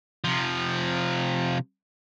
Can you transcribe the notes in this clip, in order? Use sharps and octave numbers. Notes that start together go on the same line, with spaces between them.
C3 F3